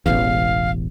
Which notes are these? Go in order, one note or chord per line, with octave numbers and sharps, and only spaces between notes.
E1 A1 E2 F5